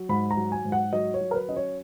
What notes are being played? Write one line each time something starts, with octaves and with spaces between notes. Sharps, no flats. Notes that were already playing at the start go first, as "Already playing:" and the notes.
Already playing: F#3
G#2 B5
A#5
F#3
G#5
G#2
F#5
F#3 D#5
C#5
F#3
A#4
B4
C#4 D#5
C#5